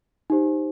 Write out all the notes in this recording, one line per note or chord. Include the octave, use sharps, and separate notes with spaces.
D#4 G4 C5